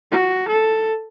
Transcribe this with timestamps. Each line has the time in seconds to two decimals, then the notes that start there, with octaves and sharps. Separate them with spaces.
0.11 F#4
0.48 A4